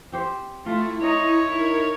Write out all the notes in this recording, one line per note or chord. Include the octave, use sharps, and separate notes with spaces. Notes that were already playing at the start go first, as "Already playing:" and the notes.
C4 G4 C5
A3 E4 F4
D#4 C#5
D#4 E4 A#4 G#6